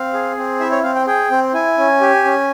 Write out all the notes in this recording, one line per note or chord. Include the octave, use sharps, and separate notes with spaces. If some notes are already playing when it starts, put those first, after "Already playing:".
Already playing: C4 F5
G#4
C4
E4 E5
C#5
C4 F5
G5
G#4 G5
C4
E4 G#5
C#4
G4
C#4